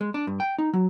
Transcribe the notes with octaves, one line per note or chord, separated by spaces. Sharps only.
G#3
D4
G2
G5
D#4
F#3